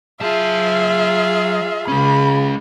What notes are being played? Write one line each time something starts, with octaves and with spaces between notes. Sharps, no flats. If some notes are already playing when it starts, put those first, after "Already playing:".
F#3 F4 G#4 E5 A5
C#3 G#3 C#4 B5